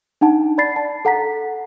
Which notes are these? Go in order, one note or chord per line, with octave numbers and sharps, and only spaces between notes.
D4 D#4 F#5 A5
D5 B5 A6 C7
A5
A4 F#5 A#5 B6